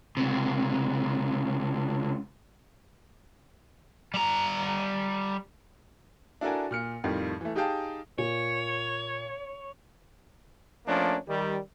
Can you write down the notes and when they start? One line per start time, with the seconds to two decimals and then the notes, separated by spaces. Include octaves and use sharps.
0.17 C#2 C3
4.14 G3 A#5
6.41 D4 E4 F#4 A4 A#4 G#5
6.71 A#2 F6 C#7
7.04 F2 A2 D#3 F3 G3
7.41 E3 A3
7.56 D#4 G4 G#4 F5 G5 A5
8.18 A#2 C#5
10.86 F3 A3 A#3 C#4 D4
11.28 D#3 G3